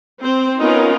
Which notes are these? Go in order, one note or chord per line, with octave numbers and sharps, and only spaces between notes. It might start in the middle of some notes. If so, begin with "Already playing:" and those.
C4 C5
B3 C#4 D#4 F4 A#4